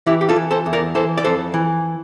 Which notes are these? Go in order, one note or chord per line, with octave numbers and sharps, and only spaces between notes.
E3 E4 G4
G4
F4 A4
E3
A4 C5
E2
A#4 D5
E3 A4 C5
D5
F2 A4 C5
E3